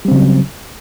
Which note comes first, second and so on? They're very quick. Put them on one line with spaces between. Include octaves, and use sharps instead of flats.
G3 C4 C#3 F#3